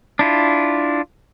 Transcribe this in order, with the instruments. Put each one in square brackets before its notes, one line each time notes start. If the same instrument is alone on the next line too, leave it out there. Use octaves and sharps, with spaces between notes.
[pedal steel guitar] D4 E4 F4